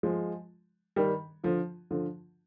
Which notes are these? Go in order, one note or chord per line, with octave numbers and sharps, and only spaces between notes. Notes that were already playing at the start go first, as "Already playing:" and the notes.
F3 G#3
D#3 G3
D3 F3
D3 F3